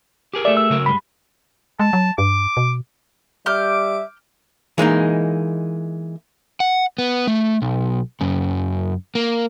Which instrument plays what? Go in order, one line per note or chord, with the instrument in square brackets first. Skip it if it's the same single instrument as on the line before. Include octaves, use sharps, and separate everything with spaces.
[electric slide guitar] G4 G#4 A#4
[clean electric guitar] A3 A4 E5 [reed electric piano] D5
[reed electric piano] E6
[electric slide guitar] C#3 F#3 A#4
[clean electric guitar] G2 G#3 [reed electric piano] B5
[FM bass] G#3 [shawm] A5
[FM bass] F#3
[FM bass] G2 [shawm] D6
[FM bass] B2
[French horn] G3 [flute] E5 [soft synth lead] D6 [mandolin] F6 G6
[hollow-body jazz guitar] E3 G#3 A#3 D#4
[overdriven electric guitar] F#5
B3
A3
B1
F#2 C#3
A#3